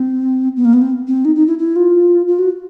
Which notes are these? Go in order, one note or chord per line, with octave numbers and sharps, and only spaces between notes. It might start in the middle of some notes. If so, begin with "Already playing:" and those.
Already playing: C4
B3
A#3
B3
C4
C4
D#4
D#4
E4
E4
F4
F4
F#4